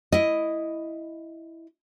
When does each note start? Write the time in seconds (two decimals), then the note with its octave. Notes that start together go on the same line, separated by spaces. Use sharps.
0.12 E4 D#5